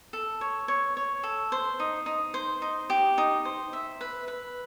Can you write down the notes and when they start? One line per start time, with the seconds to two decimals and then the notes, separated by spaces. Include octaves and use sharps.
0.13 A4
0.41 C#5
0.68 C#5
0.97 C#5
1.23 A4
1.52 C5
1.80 D#4
2.06 D#4
2.34 C5
2.62 D#4
2.90 G4
3.18 D#4
3.45 C5
3.73 E5
4.01 B4
4.28 B4